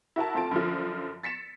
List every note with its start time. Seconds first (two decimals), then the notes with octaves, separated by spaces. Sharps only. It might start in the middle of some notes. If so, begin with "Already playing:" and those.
0.16 E4 F#4 A#4 A5
0.35 D2 A3 C4 F4 A5 D7
0.51 F#2 D3 F3
1.23 A6 B6 C#7 E7